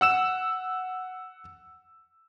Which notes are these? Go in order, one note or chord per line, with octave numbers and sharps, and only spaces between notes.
F#5 E6 E7